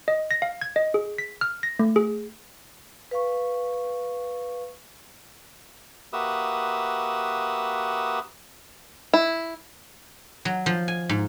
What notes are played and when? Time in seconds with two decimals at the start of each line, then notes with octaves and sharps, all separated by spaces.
0.08 D#5
0.31 A#6
0.42 F5
0.61 G#6
0.76 D#5
0.94 G#4
1.18 B6
1.41 F6
1.63 A#6
1.79 A3
1.96 G#4
3.11 B4 F5 C#6
6.13 A#3 F#4 G4 B4 E5 D#6
9.13 E4
10.45 F#3
10.66 F3
10.88 G#5
11.09 G#2